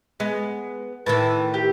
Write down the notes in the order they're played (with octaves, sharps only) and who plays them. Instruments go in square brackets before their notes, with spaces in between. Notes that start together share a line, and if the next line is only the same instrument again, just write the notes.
[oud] G#3 [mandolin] B3
[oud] A2 D#3 E3 [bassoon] B4 [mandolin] A5
[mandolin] G4